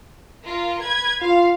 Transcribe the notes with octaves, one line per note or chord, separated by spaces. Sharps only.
F4 A#4
B4 G#6
F4 F5